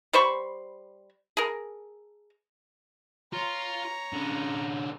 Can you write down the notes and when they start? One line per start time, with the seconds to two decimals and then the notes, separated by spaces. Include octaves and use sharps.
0.13 G3 C5 B5 C#6
1.37 G#4 A#4
3.33 F4 C#5 A#5
4.13 D3 C#4